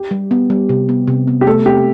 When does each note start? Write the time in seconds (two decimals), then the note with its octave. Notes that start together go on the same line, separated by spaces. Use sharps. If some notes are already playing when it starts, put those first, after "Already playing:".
Already playing: G4
0.11 G3
0.31 B3
0.50 G3
0.69 C3
0.89 B3
1.08 C3
1.27 B3
1.41 G4
1.47 A3 A4
1.66 C4 G4